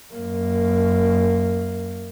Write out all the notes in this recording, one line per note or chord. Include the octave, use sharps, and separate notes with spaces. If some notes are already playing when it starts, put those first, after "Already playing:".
F#2 A#3